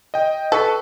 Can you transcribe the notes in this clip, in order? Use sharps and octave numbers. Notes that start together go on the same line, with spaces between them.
D#5 G5
A4 B4 C#6 B6